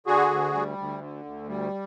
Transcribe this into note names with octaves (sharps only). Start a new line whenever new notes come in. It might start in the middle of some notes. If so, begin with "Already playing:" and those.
D3 F#4 G#4
D2
G3
D2
D3
D2
G3